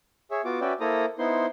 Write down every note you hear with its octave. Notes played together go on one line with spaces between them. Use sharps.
G#4 C#5 E5
B3 F4 F#4 D6
C#4 F#4 B4 D5 E5 G5
A#3 E4 A4 C5 A#5 D#6
B3 D#4 E4 C5 C6